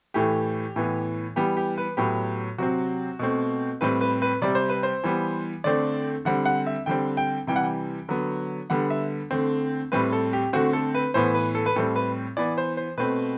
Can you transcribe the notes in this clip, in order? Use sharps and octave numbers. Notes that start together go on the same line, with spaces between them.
A2 E3 A3 G4
A2 E3 B3
E3 G3 B3 G4
G4
B4
A2 F#3 B3 G4
C3 F#3 C4 F#4
B2 A3 C4
A2 G3 C4 B4
B4
B4
C3 G3 C4 D5
C5
B4
C5
E3 G3 B3
D3 A3 C4 D5
D3 G3 C4 F#5
F#5
E5
D3 G3 C4 G5
G5
C3 E3 G3 G5
F#5
G5
D3 F#3 B3
D3 G3 B3 F#5
E5
D3 A3 C4
A2 G3 C4 B4
A4
G4
D3 A3 C4 F#4
A4
B4
A2 E3 B3 C5
B4
A4
B4
A2 G3 C4 A4
B4
E3 B3 D5
C5
C5
B2 A3 C4 B4